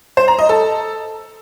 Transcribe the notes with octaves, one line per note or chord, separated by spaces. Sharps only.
C5
A#5
D#5
A4